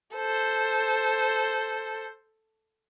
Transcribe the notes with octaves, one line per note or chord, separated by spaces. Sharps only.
A4 C5